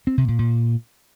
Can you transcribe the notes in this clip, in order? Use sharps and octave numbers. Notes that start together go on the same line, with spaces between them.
C4
C3
A#2
A#2